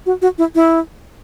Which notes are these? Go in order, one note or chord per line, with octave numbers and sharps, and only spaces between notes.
F#4
F#4
E4
E4